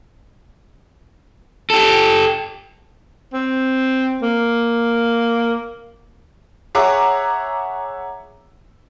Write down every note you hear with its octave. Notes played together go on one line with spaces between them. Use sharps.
G4 A4
C4
A#3
G#4 C#5 E5 F#5 A#5 D6